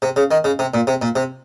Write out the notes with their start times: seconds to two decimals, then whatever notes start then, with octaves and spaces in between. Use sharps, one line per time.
0.02 C3
0.16 C#3
0.31 D#3
0.44 C#3
0.59 C3
0.74 A#2
0.87 C3
1.02 A#2
1.16 C3